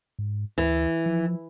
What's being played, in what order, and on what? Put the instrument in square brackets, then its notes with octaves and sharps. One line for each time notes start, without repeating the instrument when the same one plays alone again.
[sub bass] G#2
[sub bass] D2 [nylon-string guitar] E3
[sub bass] F3